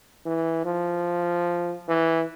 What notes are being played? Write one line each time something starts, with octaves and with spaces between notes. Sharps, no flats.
E3
F3
E3